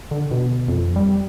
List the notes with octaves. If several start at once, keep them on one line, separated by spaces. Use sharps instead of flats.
D3
B2
F2
G3